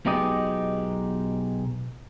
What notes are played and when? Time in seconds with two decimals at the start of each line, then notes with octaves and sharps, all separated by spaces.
0.06 B1 B2 G#3 D#4 G4 D#5